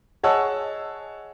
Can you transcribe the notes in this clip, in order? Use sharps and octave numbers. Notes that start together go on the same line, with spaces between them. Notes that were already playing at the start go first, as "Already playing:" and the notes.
G#4 C#5 D#5 F#5 A5 E6